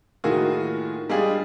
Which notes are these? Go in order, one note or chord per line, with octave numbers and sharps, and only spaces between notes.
A2 D#3 A#3 F4 F#4 G#4
G3 G#3 D4 F4 G#4